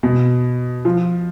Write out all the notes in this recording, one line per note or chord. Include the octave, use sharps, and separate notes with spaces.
B2
F3